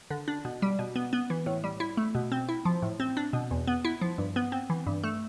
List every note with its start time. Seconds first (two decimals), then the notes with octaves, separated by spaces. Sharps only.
0.11 D3
0.28 D4
0.45 B2
0.62 G3
0.79 B2
0.96 B3
1.13 B3
1.30 E3
1.46 A2
1.64 G3
1.80 E4
1.97 A3
2.15 B2
2.32 C4
2.49 E4
2.65 F3
2.82 A2
3.00 C4
3.17 D4
3.33 B2
3.51 E2
3.67 B3
3.85 E4
4.01 F3
4.18 G2
4.36 B3
4.52 C4
4.70 E3
4.86 G2
5.03 A3